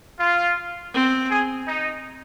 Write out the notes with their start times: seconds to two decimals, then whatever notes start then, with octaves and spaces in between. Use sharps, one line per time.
0.19 F4
0.94 C4
1.30 G#4
1.67 D#4